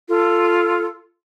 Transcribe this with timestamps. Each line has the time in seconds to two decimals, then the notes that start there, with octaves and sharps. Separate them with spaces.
0.08 F4 A4